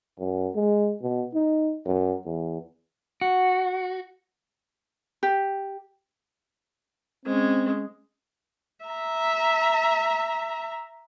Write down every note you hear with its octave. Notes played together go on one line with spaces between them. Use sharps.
F#2
G#3
B2
D#4
F#2
E2
F#4
G4
G#3 C4 C#4
E5 A#5